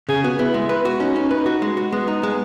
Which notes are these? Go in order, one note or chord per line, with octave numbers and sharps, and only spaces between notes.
C#3 G#4
B3 F#4
B3 E4
G#3
B4
F#4
C#4 D#4
C#4
B4
F#4
G#3
F#4
G#3 B3
D#4
G#3